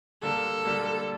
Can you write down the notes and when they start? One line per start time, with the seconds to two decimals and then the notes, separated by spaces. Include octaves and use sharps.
0.23 D3 G3 A#3 A4
0.65 D3 G3 A#3